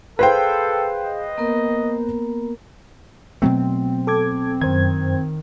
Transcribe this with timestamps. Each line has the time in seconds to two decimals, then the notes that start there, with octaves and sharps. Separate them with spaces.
0.19 G#4 A4 B4 C5 F5 G5
1.04 D#5
1.38 A#3 B3 A#4
3.42 B2 F#3 A3 C4
4.07 A4 D6 G#6
4.61 F#2 D#3 C5 G#6